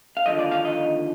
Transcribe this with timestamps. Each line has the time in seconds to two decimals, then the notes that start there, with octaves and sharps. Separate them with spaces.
0.17 F5
0.26 D#2 D3 F3 D#5
0.39 D5
0.51 F5
0.65 D#5